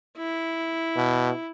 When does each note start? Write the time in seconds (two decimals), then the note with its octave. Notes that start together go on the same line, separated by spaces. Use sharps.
0.17 E4
0.97 B2